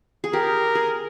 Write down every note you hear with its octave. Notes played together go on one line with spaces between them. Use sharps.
G#4
G4 A#4
G#4